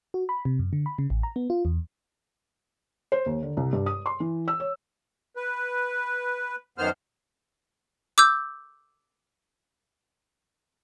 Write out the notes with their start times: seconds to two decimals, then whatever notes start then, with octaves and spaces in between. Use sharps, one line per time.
0.14 F#4
0.29 B5
0.45 C3
0.59 F#2
0.73 D3
0.86 B5
0.98 C#3
1.10 A1
1.23 A#5
1.36 B3
1.50 F4
1.65 E2
3.12 C5
3.26 D#2
3.43 D3
3.57 C2
3.73 G2
3.86 D#6
4.06 C6
4.20 E3
4.48 E6
4.60 C#5
5.36 B4
6.78 F#2 D#3 B3 C5 F6
8.18 D6 E6 G6